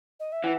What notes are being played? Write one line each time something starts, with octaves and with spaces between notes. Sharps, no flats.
D#5
E5
E3 F#5